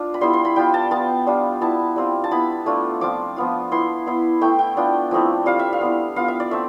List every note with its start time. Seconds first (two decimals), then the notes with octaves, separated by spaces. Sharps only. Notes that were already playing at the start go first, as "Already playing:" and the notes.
Already playing: D4 F4
0.14 B5
0.21 G3 B3 E4 C6
0.33 C6
0.45 B5
0.56 G3 B3 F4 G5
0.74 A5
0.91 B3 F4 A5
1.27 G3 D4 F4
1.61 B3 E4 A5
1.96 G3 C4 F4
2.24 A5
2.31 B3 E4 B5
2.66 A3 D4 F4
3.01 F3 C4 F4 D6
3.36 F3 B3 F4
3.71 B3 E4 C6
4.06 B3 E4
4.41 A3 E4 G5
4.59 G5
4.76 B3 D4 F4
5.11 F3 A3 C4 E4
5.46 G3 C4 F4 F5
5.59 E5
5.73 F5
5.81 B3 E4
6.16 B3 F4 F5
6.28 E5
6.40 D5
6.51 A3 C4 E5